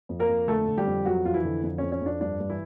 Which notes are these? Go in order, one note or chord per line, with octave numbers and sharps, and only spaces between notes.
F2
A#3 A#4
F2
D3 A3 A4
D3
G3 G4
F2
F2 F#3 F#4
F2 F4
E3 E4
D3
F2
F2 C#4
C#4
F2 D4
G2 D4
G2
E3 E4